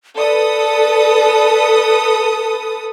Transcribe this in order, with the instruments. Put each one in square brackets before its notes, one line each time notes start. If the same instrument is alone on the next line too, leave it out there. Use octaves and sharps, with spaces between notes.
[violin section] A4 B4 D#6 [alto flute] D5